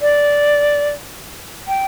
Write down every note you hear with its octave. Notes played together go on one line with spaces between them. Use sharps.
D5
G5